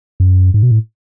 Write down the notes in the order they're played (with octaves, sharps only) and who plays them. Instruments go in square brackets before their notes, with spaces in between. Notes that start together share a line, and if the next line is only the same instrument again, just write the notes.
[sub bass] F#2
G#2
B2
A2